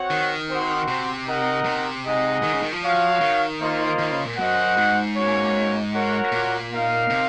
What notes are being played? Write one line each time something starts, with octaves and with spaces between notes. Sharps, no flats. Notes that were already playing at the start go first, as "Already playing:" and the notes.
Already playing: C4 F#4 C#5 F#5
D#3
C4 F#4 C5 F#5
C3
D#4 A#4 D#5 F#5
C3
G#3 D#4 G#4 D#5 F#5
D#3
C#3
D#3
F3
F#4 C#5 F5
D#3
A#3 F4 C5 D#5
D#3
C#3
A#2
F#2 F#4 C5 D#5 F#5
G#2
A#3 C#4 F#4 C#5
F#4 A#4 C#5 F#5
A#2
D#4 A#4 F5
C3